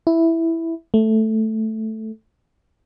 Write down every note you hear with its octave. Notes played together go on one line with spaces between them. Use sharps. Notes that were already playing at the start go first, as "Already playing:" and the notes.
E4
A3